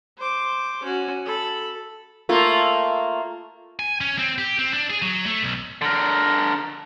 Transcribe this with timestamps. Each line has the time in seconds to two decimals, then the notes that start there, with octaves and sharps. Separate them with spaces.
0.17 C5 D6
0.83 C#4 F#4
1.25 A4 B5
2.29 A3 A#3 F4
3.79 G#5
4.01 C#4
4.19 C4
4.38 G4
4.59 C4
4.73 D4
4.90 G#4
5.02 F#3
5.26 A3
5.42 B1
5.82 D3 A#4